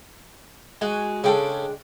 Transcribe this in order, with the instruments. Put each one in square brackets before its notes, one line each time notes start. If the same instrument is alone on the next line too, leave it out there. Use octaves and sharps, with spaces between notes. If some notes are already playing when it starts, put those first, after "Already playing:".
[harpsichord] G#3 [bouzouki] F#4 G#5
[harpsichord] C#3 C#4 A4 [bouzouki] G#3 D4 G5